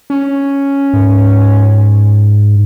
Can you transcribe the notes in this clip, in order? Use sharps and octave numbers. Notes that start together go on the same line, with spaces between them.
C#4
G#2